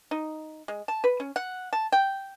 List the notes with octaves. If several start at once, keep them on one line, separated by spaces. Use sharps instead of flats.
D#4
G#3
A5
B4
C#4
F#5
A5
G5